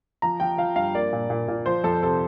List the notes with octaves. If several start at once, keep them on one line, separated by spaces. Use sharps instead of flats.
F3 A#5
F3 G5
F3 F5
G2 F5
A#3 D5
A#2
A#2
A#2
F3 C5
F2 A4
C3 A4